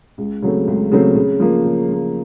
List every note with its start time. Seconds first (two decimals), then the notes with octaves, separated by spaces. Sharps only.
0.18 C#2
0.42 C#3 F#3 A3 C4
0.67 C#2
0.91 C#3 F#3 A3 C4
1.15 C#3
1.40 F3 A#3
1.64 C#3
1.89 F3 A#3